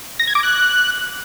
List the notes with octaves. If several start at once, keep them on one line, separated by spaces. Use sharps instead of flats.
A#6
G#6
D6
F#6